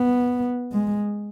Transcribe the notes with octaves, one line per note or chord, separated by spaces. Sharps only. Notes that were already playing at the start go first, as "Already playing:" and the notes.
Already playing: B3
G#3